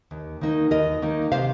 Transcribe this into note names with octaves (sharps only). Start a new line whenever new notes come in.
D#2
D#3 A#3 D#4
D#2 A#4 D#5
D#3 A#3 D#4
C3 C5 F5